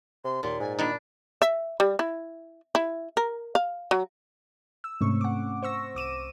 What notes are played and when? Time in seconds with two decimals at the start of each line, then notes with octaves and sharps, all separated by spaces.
0.24 C3 C6
0.43 D#2 A#2 C6
0.60 G#2 G#5
0.79 A#2 D#3 D4 D#4 B5
1.42 E5
1.80 G3
1.99 E4
2.75 E4
3.17 A#4
3.55 F5
3.91 F#3
4.84 E6
5.01 G#2 C3 A3 C4 C#4 C#6
5.21 F#5 D6
5.63 C5 C#6 E6 A#6
5.95 C2 D6 D#7 E7